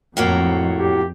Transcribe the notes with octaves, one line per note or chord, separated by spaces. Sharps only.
F2 A2 F#3 A#3
G4